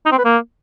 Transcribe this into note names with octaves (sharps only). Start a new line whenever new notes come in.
D#4
C4
B4
A#3